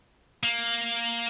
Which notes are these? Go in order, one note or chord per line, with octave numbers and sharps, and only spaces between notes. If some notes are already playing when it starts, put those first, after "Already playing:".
A#3